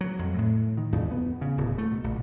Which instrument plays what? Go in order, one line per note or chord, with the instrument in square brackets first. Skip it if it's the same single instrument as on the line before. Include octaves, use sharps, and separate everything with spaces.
[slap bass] F#3
F2
A2
D#3
E2
B3
C#3
D1
A3
B2
A#1